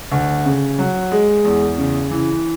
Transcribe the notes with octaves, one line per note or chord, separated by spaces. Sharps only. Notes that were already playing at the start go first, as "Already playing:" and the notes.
D2
C#3
F#3
G#3
E2
C#3
E3